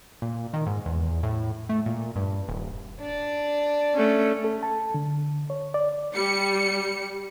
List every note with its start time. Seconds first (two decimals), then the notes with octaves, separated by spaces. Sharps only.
0.22 A#2
0.53 D#3
0.67 G#2
0.86 E2
1.23 A2
1.69 A3
1.86 A#2
2.16 G2
2.48 D#1
3.00 D4 D5
3.95 A3 C#4
4.44 A4
4.63 A5
4.94 D3
5.50 C#5
5.74 D5
6.15 G3 C#7